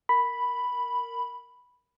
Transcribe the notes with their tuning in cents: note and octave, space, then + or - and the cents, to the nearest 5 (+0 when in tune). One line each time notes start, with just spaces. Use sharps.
A#4 -10 B5 +0